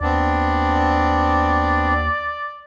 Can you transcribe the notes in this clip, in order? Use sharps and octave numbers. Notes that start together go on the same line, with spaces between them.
D#2 B3 C4 D4 D5